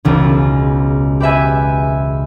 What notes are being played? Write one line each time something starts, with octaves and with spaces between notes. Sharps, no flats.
E1 C#2 C#3
G4 B4 E5 G#5